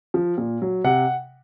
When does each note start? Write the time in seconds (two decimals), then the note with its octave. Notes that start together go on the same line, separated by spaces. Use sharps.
0.14 F3
0.38 A#2
0.62 F#3
0.84 C3 F#5